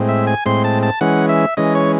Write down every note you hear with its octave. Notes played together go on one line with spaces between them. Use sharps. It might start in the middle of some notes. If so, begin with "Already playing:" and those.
Already playing: A2 G#3 C4
E5
G#5
A2 G#3 C4 C6
A5
A5
E3 G#3 C#4 F#5
E5
E3 G#3 C#4 D#5
C#5